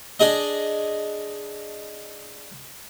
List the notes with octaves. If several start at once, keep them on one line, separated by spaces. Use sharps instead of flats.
D4 G#4 D#5